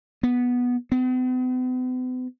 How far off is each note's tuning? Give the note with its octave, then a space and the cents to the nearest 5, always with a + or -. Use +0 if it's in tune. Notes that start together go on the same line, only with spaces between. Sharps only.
B3 -5
B3 +45